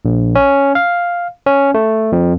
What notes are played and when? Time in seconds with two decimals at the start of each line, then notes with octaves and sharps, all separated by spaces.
0.05 A#1
0.35 C#4
0.75 F5
1.46 C#4
1.74 A3
2.12 F2